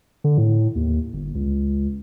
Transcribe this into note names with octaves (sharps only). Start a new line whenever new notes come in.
D3
A2
D#2
G1
C#2